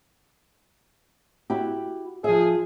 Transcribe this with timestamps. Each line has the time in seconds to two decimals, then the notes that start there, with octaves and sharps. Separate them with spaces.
1.50 E4 F#4 G4
2.24 F3 G#4 E5